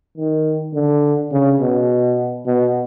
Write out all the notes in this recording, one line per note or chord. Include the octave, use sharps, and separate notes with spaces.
D#3
D3
C#3
B2
B2